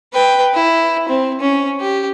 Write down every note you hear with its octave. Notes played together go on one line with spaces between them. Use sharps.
B4 G5
E4
C4
C#4
G4